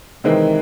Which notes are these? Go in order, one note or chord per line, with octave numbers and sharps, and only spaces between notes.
C3 D#3 E3 G#3 C4